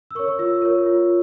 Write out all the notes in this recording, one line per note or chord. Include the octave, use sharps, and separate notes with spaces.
E6
A#4 C#5 C#6
C#6
F4 E6
A#4 C#5
F4